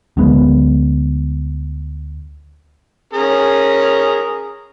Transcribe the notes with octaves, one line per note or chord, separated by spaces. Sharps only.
D2 F#3 G#3 B3
C#4 G#4 A#4